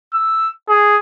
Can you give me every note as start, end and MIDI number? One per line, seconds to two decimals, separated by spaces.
0.14 0.49 88
0.69 0.98 68